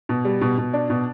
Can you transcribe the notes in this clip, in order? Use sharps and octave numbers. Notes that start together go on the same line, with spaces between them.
B2
G3
B2
B2
D4
B2